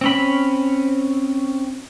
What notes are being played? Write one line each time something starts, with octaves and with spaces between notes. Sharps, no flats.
C4 C#4 B5